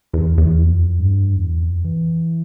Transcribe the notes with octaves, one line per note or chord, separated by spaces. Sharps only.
E2
E2
F2
G2
E2
F2
E3